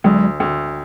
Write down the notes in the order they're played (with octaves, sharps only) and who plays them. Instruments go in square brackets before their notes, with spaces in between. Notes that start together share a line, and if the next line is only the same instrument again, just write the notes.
[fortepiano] D2 [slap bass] F#3 G#3
[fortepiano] D2